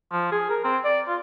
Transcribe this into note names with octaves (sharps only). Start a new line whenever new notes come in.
F3
G#4
A#4
C4
D5
F4